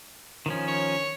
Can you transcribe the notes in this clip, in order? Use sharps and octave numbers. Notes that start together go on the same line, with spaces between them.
D#3 F3 C#4
C#5